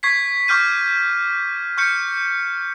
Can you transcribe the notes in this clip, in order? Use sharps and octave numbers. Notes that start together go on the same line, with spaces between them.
C#6 G#6 B6 C7
C#6 D6 F6 G6 D#7
C#6 F6 G6 C#7